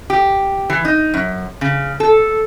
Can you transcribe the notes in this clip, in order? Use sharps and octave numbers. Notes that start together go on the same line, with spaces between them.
G4
E3
D#4
F#2
C#3
A4